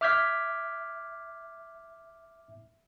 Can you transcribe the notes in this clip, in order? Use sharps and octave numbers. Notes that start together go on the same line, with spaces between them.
E5 D6 F6 G6 G#6 B6